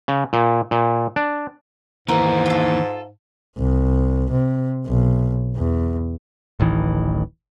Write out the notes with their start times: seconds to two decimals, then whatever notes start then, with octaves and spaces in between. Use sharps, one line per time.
0.08 C#3
0.33 A#2
0.71 A#2
1.16 D4
2.08 D#2 G#2 E3 A#4 C5
2.46 F4 A4
3.58 C2
4.31 C3
4.87 B1
5.57 E2
6.60 D1 A1 D#3 E3